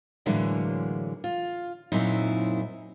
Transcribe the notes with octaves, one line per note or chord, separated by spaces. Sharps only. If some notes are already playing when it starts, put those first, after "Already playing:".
A2 D3 E3 F#3 G#3 A#3
F4
F#2 A#2 F#3 C4 D#4 E4